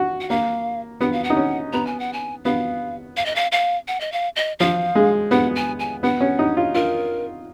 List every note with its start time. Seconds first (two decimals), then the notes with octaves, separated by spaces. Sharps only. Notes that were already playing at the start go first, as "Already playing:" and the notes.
Already playing: F#4
0.20 F#5
0.30 A#3 F5
1.01 B3 F#5
1.13 F5
1.24 F#5
1.30 D#4
1.36 C#4
1.73 B3 A#5
1.87 G#5
2.00 F#5
2.13 G#5
2.45 B3 F5
3.17 F5
3.25 D#5
3.35 F5
3.52 F5
3.88 F#5
4.00 D#5
4.12 F5
4.36 D#5
4.59 F3 F5
4.95 G#3
5.31 B3 F#5
5.55 G#5
5.79 G#5
6.03 B3 F#5
6.21 C#4
6.39 D#4
6.57 F4
6.75 F4 A#4